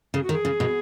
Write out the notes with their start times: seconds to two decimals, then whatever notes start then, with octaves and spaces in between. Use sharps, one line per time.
0.14 C#3 G#4
0.23 F#4
0.29 D#3
0.32 G#4
0.45 C#3
0.60 B2